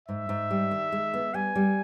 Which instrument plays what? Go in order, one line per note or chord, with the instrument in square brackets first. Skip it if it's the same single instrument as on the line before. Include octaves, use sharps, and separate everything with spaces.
[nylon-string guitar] G#2 [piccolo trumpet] E5
[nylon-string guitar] G#2
G3
D#3
G#3
B3
[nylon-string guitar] G3 [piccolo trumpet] G#5
[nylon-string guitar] G3